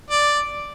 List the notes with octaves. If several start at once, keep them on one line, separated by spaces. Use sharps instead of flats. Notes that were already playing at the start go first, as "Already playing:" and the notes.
D5